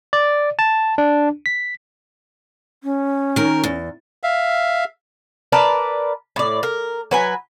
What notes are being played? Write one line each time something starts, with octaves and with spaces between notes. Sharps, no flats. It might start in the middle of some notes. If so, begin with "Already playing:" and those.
D5
A5
D4
B6
C#4
D#3 A#4
E2
E5 F5
A#4 B4 D5 A5
A2 D5
A#4
F#3 B4 G#5